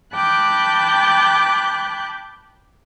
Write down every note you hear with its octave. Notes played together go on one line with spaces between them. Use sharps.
G5 A5 B5 D6 F#6 G6